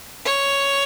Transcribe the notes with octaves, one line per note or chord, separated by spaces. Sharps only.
C#5